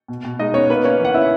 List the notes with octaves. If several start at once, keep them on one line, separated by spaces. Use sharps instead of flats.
B2
B2
G#3 D#4 D#5
B3 C#4 C#5
A#3 B3 B4
A#3 C#4 C#5
E3 F#5
C#4 E4 E5